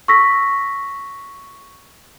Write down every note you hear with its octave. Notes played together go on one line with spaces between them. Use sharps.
C#6 E6 A#6 B6